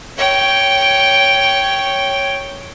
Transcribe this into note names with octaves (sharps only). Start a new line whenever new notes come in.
C#5 G5